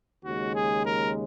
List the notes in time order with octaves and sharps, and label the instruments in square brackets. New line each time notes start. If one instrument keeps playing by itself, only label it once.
[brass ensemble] D#2 C#3 G#3 F#4
G#4
A#4